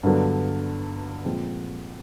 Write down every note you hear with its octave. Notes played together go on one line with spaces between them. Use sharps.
G2 D3 F#3 B3
A#2 F3 G#3 C4